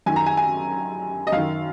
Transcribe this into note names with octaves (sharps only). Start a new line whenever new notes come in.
F#2 D#3 G#5
A#5
G#5
G#5
D#5
F#2 D#3 F5